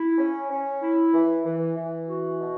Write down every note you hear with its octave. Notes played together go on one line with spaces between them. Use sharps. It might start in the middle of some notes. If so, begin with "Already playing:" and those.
Already playing: E4
C#4
C#4
E4
E3
E3
E3
F#4
B2